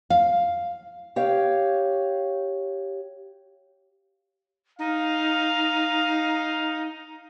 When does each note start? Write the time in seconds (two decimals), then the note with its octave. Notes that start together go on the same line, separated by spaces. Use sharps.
0.10 F5
1.16 G4 C#5 F5
4.79 D#4 F5